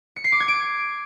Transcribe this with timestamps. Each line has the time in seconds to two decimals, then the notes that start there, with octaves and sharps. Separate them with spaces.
0.16 C#7
0.24 C7
0.32 D6
0.40 G#6
0.48 D7